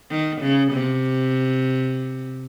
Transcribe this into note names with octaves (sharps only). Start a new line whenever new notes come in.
D#3
C#3
C3